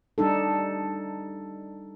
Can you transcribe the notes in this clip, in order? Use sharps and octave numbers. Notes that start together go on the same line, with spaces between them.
G3 D4 D#4 A4